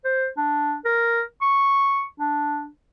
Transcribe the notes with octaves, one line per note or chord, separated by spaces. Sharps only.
C5
D4
A#4
C#6
D4